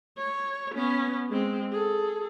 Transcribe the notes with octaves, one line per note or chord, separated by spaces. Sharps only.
C#5
B3 C#4
G#3 C4
G#4 A4